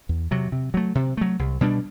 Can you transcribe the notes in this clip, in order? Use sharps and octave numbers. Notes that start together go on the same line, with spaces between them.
E2
C3 F#3
C3
F#3 A3
C3
F#3 A3
C2
B2 G3 D4